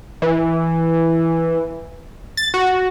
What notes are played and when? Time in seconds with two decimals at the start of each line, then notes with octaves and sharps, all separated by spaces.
0.22 E3
2.37 A6
2.54 F#4